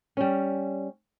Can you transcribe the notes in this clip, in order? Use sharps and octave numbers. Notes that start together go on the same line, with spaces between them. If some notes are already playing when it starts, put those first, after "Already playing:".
G3 C#4